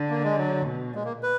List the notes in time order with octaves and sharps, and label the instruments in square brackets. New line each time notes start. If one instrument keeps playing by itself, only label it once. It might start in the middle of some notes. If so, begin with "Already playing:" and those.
Already playing: [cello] D3
[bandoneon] A#3
G#3
F#3
[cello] B2
[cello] A#2 [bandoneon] G#3
[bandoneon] A#3
B4